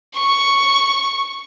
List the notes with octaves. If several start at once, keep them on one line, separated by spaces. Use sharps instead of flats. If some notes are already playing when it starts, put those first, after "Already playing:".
C#6